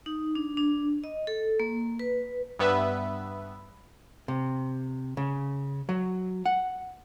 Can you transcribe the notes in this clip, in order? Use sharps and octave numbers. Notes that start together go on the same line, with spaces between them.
D#4
D4
D4
D#5
A4
A#3
B4
G2 B3 B4 E5
C3
C#3
F#3
F#5